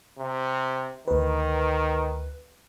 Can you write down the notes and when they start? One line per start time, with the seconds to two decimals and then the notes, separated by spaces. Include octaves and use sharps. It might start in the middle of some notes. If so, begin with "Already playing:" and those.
0.19 C3
1.08 D2 D#3 B4